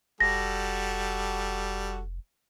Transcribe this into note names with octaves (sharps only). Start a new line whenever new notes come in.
F1 G3 F#4 A4 A#6